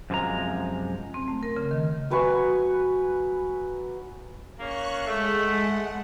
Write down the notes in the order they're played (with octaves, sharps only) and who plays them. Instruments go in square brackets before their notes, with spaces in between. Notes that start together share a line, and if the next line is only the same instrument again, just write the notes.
[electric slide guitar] F#2 C3 F3 G#3 A#5
[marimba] C4
A3
A#4
C#3
D#3
[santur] F#3 B4 G#5 C#6
[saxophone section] A#3 C#4 [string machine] C#6 F#6
[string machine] G#3 F#5 [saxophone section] A3